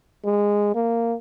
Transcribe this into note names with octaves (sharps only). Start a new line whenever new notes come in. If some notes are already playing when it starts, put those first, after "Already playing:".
G#3
A#3